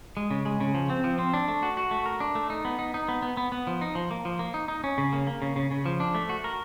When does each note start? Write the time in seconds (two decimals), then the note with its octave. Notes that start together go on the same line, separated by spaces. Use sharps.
0.17 G#3
0.31 C#3
0.46 G#3
0.60 C#3
0.74 F3
0.90 C4
1.04 F3
1.19 C4
1.34 D4
1.48 A3
1.63 F#4
1.77 F#4
1.91 A3
2.06 A#4
2.20 D4
2.35 A3
2.50 D#4
2.65 B3
2.79 D#4
2.94 D#4
3.08 B3
3.22 B3
3.37 B3
3.52 B3
3.67 F3
3.81 D#4
3.95 F3
4.11 A#3
4.25 F3
4.39 A#3
4.54 D#4
4.68 D#4
4.84 C#4
4.98 C#3
5.13 A#3
5.27 A#3
5.42 C#3
5.56 C#3
5.71 C#3
5.86 F3
6.00 D4
6.15 A3
6.29 F#4
6.44 A#4